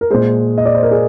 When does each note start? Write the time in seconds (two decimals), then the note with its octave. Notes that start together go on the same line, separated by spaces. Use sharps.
0.01 A#4
0.10 A#2 G#3 C5
0.58 D#5
0.65 D5
0.75 C5
0.83 A#4
0.91 G#4